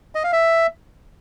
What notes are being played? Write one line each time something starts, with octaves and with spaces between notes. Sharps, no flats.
D#5
F5
E5